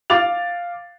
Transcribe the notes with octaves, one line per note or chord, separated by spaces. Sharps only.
F5 D6 A6 F7